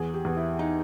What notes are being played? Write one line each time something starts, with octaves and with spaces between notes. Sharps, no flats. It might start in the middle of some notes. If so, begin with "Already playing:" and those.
Already playing: E2 G#4
G4
E2
E4
D#4